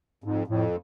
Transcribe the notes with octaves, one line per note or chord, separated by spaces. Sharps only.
F2 G#2
F2 A2